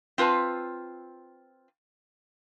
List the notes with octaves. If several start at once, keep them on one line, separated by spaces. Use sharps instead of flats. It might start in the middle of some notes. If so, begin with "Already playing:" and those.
C4 F4 B4 A5